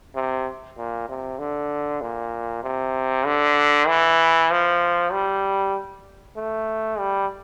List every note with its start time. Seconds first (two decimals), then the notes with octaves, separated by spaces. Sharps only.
0.15 C3
0.77 A#2
1.09 C3
1.39 D3
2.01 A#2
2.64 C3
3.26 D3
3.88 E3
4.51 F3
5.12 G3
6.36 A3
6.99 G3